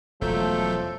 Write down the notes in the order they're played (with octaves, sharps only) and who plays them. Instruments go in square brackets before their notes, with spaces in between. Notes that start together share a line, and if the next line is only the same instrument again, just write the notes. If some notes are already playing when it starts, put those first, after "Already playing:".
[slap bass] E1 [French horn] F3 [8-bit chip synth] F#3 A3 G6 [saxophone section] A4